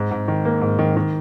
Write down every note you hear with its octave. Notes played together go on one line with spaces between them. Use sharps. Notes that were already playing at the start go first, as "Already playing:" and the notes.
Already playing: G#2
G#2
D#3
A#3
G#2
D#3
D#3